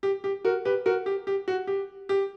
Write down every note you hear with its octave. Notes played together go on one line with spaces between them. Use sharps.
G4
G4
F#4 A#4
G4 B4
F#4 A#4
G4
G4
F#4
G4
G4